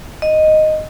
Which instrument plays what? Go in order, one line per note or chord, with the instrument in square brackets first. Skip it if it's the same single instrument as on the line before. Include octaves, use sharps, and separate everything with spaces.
[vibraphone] D#5